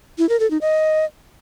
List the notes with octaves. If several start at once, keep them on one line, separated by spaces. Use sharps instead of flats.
E4
A#4
A4
D#4
D#5